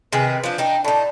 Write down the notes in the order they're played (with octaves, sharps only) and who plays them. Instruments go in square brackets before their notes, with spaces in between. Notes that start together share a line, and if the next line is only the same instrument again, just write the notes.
[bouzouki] C3 D#3 G#4 [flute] B4
[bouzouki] F3 D4
[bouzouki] D4 D#4 [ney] G5
[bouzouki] A2 D#4 [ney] D5 [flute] A5